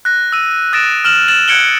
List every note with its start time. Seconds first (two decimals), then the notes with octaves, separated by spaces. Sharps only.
0.05 F#6 A#6
0.33 E6 D#7
0.73 D#6 F#6 A6 A#6 D7 E7
1.05 F6 E7 F#7
1.28 A6 E7 F#7
1.48 F#6 G#6 C#7 D7 F#7 G7